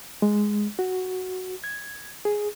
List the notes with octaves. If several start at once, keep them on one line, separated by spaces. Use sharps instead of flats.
G#3
F#4
G#6
G#4